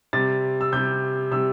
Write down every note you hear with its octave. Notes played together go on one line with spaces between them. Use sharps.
C3 G3 A6
E6
C3 G3 G6
C3 G3 E6